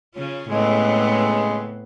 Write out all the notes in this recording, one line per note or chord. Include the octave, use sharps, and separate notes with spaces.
C#3 C#4 F4
A2 C#3 G#3 B3 C4